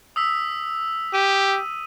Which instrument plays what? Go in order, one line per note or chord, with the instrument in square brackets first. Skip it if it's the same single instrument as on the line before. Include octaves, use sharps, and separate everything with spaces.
[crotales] D#6 E6 B6
[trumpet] G4 [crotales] D#7